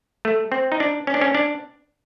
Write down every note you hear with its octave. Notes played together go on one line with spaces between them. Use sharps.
A3
C4
D#4
D4
C#4
D4
C#4
D4